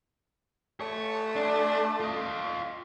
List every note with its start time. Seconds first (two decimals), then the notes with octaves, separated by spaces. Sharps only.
0.81 A3 C#5
1.35 D4
2.00 F4 D#5